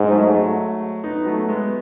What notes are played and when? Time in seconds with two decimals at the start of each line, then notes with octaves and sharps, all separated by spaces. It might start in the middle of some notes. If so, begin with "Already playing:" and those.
Already playing: G#2
0.11 F#3 A3
0.34 F#3 A3
1.04 B3 D#4
1.16 B3
1.26 F#3 A3
1.49 G#3 B3